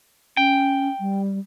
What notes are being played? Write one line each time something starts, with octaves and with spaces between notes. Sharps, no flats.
C#4 G5
G3